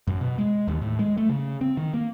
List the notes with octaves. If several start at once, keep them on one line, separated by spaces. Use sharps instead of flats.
F#2
B2
G#3
D#2
A2
G#3
A3
C#3
C4
D#3
A#3